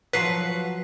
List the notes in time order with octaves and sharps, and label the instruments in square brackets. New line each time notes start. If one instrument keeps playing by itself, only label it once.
[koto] F3 F#3 F#5 [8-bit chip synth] B4 [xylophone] B6 C7